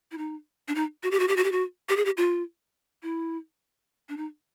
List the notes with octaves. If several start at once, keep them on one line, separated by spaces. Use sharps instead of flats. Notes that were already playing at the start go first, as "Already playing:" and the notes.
E4
D#4
D4
D#4
F#4
G4
F#4
G4
F#4
G4
F#4
G4
G#4
G4
F4
E4
D4
D#4